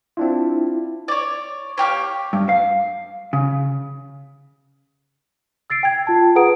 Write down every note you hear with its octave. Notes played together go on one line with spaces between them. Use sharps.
C4 D4 E4 F4
C#5 D5
A#3 D4 G4 C#5
G2
F5
C#3
E6 A6 C7 D7
G5 G#6
F4 A5
G#4 B4 F#5 A#5 D#6 D7